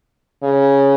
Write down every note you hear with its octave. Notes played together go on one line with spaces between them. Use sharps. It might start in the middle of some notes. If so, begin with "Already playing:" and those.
C#3